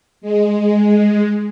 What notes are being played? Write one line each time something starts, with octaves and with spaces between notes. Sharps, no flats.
G#3